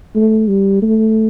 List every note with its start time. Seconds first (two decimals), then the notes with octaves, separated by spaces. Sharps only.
0.15 A3
0.48 G3
0.82 A3